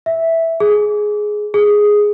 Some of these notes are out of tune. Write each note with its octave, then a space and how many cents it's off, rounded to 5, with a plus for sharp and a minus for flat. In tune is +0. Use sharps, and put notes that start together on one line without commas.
E5 -5
G#4 +10
G#4 +0